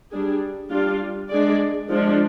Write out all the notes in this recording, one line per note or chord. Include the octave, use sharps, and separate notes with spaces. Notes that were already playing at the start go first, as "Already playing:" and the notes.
G3 D4 G#4
G3 D4 F4
G#3 D4 G#4 D5
F3 G#3 D4